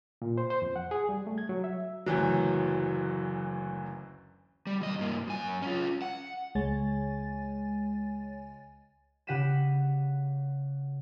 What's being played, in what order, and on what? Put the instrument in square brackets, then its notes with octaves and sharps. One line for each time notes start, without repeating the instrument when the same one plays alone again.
[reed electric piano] A#2
C5
C5
F2
F#5
G#4
G3
A3
G#6
F#3
E5
[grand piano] F#1 D2 E3 F#3
[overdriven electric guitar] G3
D#2 D#5
G2 A#3
F#2 G#5
C#4 F4
F#5
[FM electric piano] C#2 G#3 C#5 G#5 A6
[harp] C#3 G4 F#5 B6 D#7 E7